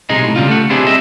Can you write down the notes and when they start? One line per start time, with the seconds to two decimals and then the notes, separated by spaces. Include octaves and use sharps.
0.09 B1 C3 G#3 D#4 G#4 D#5
0.24 A2
0.36 C#3 G3 F4
0.48 A3 F#5
0.70 B3 C4 D4 E4 G4 G#4
0.87 G3 G#4 D#5 E5